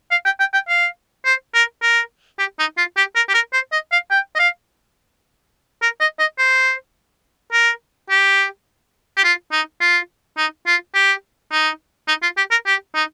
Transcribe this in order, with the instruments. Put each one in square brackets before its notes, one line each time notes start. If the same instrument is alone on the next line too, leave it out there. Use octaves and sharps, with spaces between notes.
[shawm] F5
G5
G5
G5
F5
C5
A#4
A#4
G4
D#4
F4
G4
A#4
G4
A#4
C5
D#5
F5
G5
D#5
F5
A#4
D#5
D#5
C5
A#4
G4
G4
F4
D#4
F4
D#4
F4
G4
D#4
D#4
F4
G4
A#4
G4
D#4